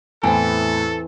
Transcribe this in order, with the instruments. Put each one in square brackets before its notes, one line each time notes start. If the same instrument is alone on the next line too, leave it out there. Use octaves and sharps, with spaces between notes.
[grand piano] E2 A2 [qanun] E3 C4 [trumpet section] A4 [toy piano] G#5